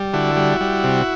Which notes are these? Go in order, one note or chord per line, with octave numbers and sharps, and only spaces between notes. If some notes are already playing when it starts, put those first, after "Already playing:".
Already playing: G3
D3 E4 F#4
G3
G3
C3